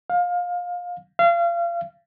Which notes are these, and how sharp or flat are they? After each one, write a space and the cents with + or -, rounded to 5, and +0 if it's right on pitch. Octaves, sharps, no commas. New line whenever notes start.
F5 +25
F5 -30